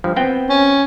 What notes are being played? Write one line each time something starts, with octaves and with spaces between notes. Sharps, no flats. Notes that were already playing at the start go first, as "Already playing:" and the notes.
G2 F3
B3 C4 G5
C#4